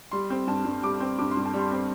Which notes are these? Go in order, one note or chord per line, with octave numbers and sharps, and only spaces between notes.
G3 C6
C4
G2 A5
G2
G3 D6
C4
G2 D6
C6
G2
A5
G3
C6
C4